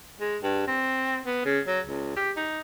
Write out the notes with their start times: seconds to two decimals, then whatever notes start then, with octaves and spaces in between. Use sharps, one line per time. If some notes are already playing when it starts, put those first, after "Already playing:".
0.20 G#3
0.42 G2
0.67 C4
1.25 B3
1.45 C#3
1.67 F#3
1.87 C#2
2.16 G4
2.37 D#4